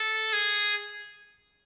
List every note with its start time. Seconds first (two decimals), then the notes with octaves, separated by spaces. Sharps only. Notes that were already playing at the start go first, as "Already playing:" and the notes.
Already playing: A4
0.33 G#4